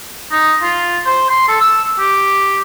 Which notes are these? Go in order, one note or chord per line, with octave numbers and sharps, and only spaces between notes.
D#4
F4
C5
C6
A4
E6
G4